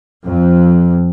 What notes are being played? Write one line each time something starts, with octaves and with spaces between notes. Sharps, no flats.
F2